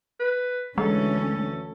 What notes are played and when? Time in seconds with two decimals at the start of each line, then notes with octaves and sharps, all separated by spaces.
0.20 B4
0.78 D2 E3 G#3 C#4 A4